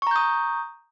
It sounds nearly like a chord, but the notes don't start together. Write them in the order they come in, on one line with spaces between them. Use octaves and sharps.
C#6 A#5 G6 D#6